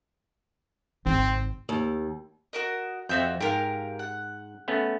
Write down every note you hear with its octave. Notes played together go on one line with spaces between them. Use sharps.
G#1 C#2 C4
D#2
F#4 A#4 D#5
F2 C4 F#4 E5 G6
G#2 G4 A#4 F5
F#5
A3 B3 C#4